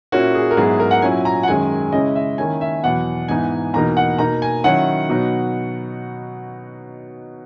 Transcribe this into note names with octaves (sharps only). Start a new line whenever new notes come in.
A#2 A#3 C#4 E4 F#4
G#4
A#4
G#2 F#3 B3 E4 G#4
A#4
F#5
A#2 F#3 C#4 E4 G#5
A#5
F#5
F#2 D#3 G#3 C#4 G#5
C#3 G#3 C#4 E4 D#5
E5
D#3 A#3 C#4 E4 G#5
E5
E2 B2 F#3 B3 F#5
G#2 E3 B3 D#4 G#5
E2 B2 A#3 D#4 A#5
F#5
B2 A#3 D#4 A#5
G#5
D#3 F#3 C#4 E4 F#5
B2 F#3 B3 D#4